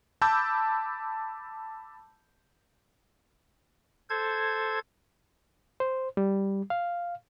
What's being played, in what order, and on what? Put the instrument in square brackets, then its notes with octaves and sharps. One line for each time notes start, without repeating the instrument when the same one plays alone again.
[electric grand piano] A5 B5 D6 E6 G6
[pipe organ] A4 C5 G#6
[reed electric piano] C5
G3
F5